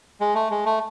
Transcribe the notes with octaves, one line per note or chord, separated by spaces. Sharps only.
G#3
A3
G#3
A3